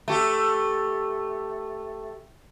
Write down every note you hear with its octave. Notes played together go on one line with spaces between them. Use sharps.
A3 G4